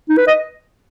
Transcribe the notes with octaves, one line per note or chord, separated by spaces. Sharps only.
D#4
B4
D#5